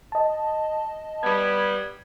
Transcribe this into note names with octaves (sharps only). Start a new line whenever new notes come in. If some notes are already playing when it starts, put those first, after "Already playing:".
D#5 A5
G3 B3 G#6